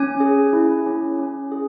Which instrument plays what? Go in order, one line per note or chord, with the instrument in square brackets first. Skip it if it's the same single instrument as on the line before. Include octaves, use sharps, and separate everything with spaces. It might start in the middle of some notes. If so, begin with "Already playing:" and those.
Already playing: [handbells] C#4 G#5
G#4
E4
C#4
C#4
G#4